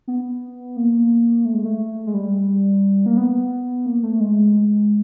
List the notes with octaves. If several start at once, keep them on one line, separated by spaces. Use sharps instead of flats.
B3
A#3
A3
G#3
A3
G#3
G3
A#3
B3
A#3
A3
G#3